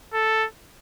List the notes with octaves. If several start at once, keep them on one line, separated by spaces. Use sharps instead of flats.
A4